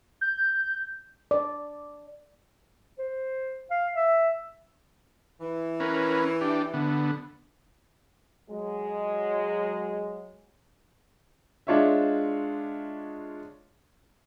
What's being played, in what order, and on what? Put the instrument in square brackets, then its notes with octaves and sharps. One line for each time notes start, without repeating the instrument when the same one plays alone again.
[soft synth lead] G6
[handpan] D5
[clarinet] C5
F5
E5
[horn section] E3
[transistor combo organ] C#4 A#4 B4
D4 G4
D3 B3
[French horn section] F#3 G#3
[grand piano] G#3 D4 F4 C#5 D#5 E5